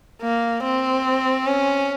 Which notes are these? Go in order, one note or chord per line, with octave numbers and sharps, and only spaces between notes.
A#3
C4
C#4